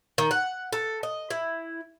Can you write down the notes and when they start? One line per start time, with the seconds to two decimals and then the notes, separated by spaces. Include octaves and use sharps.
0.18 D#3
0.31 F#5
0.73 A4
1.03 D#5
1.30 E4